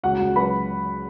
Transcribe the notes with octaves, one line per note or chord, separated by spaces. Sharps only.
C#2 F#4 F#5
C#2
F#3 B4 B5